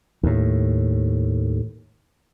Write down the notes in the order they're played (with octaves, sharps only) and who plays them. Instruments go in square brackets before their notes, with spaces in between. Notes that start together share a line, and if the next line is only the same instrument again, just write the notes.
[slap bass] D#2 A2